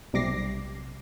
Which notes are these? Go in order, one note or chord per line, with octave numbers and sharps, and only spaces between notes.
B1 C3 G3 D6 A#6 C7